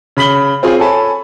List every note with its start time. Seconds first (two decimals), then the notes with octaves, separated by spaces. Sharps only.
0.17 C#3 B5 B6 F#7 G7
0.63 C4 F4 G#4 C#5
0.79 A4 C#5 G#5 A5 B5